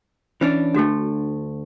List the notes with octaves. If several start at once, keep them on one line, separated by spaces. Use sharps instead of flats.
E3 C#4 D4
D2 A3 D4 F#4 A4